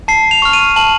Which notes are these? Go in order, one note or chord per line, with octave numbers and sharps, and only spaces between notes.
A5 C7
F7
C#6 F6
D#7
A5 F#7